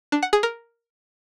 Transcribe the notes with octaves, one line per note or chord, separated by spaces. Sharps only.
D4
F#5
G#4
A#4